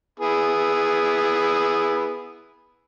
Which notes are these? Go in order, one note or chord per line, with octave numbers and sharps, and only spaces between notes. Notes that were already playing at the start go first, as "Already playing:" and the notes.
B3 E4 G#4